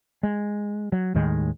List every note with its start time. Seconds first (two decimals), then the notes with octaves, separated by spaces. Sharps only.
0.23 G#3
0.92 F#3
1.14 D#2 A2 D#3 G#3